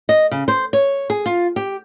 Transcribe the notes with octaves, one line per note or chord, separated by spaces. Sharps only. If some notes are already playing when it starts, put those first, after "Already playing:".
D#5
C#3
C5
C#5
G#4
F4
G4